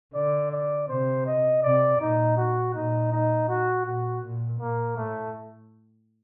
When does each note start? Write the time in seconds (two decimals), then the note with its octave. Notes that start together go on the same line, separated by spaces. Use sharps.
0.14 D3 D5
0.52 D5
0.89 C3 C5
1.26 D#5
1.63 C3 D5
2.00 A#2 D#4
2.38 F#4
2.74 A#2 D#4
3.12 D#4
3.49 F#4
3.86 A#2 F#4
4.23 A#2
4.60 A#2 A#3
4.97 A2 A3